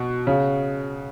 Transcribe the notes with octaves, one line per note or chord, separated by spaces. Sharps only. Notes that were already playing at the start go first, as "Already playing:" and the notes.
Already playing: B2
C#3